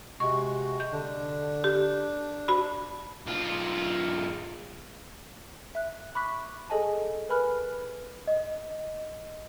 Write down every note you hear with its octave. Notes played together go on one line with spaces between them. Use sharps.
C3 G#3 F#4 C#6
G6
D3 D4
G4
F#4 B5
B1 F4
E5 F#6
B5 C#6 D6 F#6 B6
G#4 A4 D#5 G#5 A5
A#4 B4 G#5 B5 F6 F#6
D#5